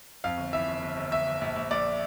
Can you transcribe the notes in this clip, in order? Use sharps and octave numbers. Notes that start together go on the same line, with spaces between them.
F2 F5
G1
E3 E5
G1
G1
G1
G1 E5
G1
A#1
A#1
A#1 D5